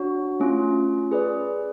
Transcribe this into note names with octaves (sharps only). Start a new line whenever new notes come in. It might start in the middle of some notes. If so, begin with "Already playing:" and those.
Already playing: D4 F#4 C#5
A3 C#4 F4
G#4 B4 D5